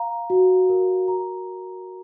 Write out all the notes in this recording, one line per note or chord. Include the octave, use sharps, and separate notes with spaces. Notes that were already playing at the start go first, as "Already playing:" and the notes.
Already playing: F5 A#5
F#4
A#4
A#5